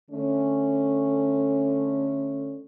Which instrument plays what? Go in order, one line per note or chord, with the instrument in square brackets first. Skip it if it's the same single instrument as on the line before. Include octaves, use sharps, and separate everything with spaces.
[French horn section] D3 A3 C#4